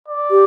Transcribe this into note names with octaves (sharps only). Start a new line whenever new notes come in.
D5
G4